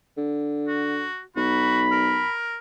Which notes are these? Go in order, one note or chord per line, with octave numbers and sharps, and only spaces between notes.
D3
F#4
B1 F#4 B5
A#4